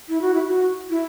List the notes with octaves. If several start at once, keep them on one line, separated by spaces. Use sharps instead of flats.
E4
F#4
E4
F#4
E4